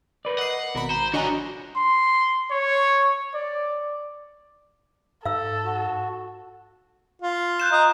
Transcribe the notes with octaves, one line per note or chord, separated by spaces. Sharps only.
A#4 B4 D5
D#5 F#5 C7
G#1 B2 F#4 A#4 B5
C5 A#5
D3 F3 D4 F#4 C#5 D#5 G#5 A#5
C6
C#5
D5
G#2 A4 F5 E6
F#4
F4
F#6 G6 E7
D#5 A#5